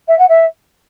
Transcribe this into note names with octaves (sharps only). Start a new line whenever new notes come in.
E5
F#5
E5